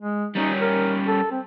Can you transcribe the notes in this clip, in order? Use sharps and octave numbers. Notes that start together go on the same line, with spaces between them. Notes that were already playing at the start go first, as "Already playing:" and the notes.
G#3
G3 C#4 D#4
A#4
A4
C4